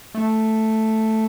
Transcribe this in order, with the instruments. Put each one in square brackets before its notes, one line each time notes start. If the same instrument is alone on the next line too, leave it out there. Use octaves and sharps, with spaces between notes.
[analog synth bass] A3